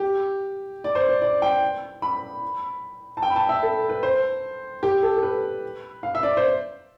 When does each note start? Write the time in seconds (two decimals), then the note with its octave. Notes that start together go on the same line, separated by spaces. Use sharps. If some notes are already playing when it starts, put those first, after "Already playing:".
Already playing: G4
0.84 D5
0.95 C5
1.09 D5
1.22 D5
1.42 G5
2.02 B5
3.17 A5
3.22 G5
3.30 B5
3.36 A5
3.49 E5
3.62 A4
3.89 B4
4.03 C5
4.83 G4
5.03 A4
5.16 A4
5.23 B4
6.03 F5
6.15 E5
6.23 D5
6.37 C5